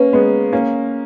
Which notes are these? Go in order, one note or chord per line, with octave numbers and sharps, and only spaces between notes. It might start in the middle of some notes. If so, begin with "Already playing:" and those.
Already playing: A#3 C#4 B4
G#3 B3
A#3 C#4